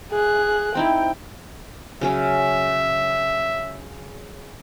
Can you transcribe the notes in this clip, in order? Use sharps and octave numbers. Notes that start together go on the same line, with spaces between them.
G#4 F#6
C4 D#4 E4 G5
C#3 F#3 C#4 E5